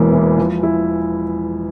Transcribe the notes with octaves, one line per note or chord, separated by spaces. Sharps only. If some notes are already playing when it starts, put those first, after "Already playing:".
Already playing: E1 E2 A#3
E3
F3
E4